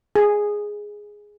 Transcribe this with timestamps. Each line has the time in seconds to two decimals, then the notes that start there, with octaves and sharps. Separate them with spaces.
0.16 G#4